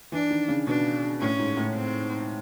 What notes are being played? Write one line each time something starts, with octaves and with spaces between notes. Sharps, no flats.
E3 D4
D#3
C#3
B2 D4
A2 C#4
G#2
A2
C4